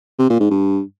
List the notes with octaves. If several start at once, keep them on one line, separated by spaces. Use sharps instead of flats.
C3
A#2
G#2
G2